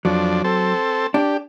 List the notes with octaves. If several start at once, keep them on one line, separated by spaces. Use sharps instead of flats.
F2 F#3 D4
C4 A4
D4 G4